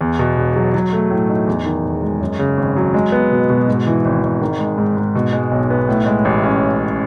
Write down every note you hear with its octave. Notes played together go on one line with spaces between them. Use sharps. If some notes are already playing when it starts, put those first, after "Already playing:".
E2
B2
E1
F#3
F#3
A3
A2
D#4
E2
D#3
E1
G#3
F#2
C#3
G#1
F#3
G#3
B3
B2
B2
G#2
E3
G#1
G#1
D#3
G#3
G#2
G#2
B2
G#3
B1
B3
A2
G#3
A1
C#4